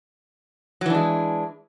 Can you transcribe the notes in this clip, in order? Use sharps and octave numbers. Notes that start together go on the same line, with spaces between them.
E3 F#3 G#3 D4